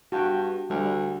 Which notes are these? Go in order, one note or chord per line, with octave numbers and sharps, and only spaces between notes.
G2 F#4 G5
D2 G3